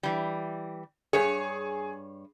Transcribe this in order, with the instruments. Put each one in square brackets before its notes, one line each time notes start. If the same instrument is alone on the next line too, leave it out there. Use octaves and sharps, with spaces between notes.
[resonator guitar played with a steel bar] E3 G3
[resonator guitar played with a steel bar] G2 C#5 [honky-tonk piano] G#4